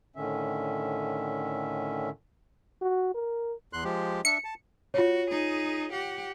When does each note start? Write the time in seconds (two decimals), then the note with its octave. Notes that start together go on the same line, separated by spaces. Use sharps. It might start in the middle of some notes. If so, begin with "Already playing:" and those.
0.16 A2 D3 D#3 C#4 E5
2.82 F#4
3.14 A#4
3.73 E2 C6 F#6
3.84 F3 G#3 G4
4.25 D4 E5 C#7
4.44 A5
4.94 F4 F#4 C#5
5.30 D#4 G#4
5.92 G4 F#5